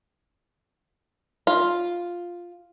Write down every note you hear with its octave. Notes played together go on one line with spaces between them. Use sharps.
F4